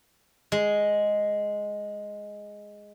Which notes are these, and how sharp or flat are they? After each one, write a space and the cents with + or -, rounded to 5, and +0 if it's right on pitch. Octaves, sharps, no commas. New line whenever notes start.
G#3 +0